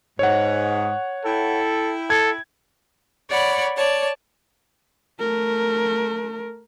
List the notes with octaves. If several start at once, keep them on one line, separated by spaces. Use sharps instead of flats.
G#2 C#5 F#5
E4 A4 G5
A4 G#6
C#5 D5 F#5 B5
C#5 D5 A5
A3 A#4